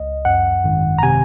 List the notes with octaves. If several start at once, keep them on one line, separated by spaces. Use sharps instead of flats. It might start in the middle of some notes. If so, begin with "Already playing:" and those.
Already playing: C#2 D#5
F#2 F#5
G#1
A#5
C3 G#5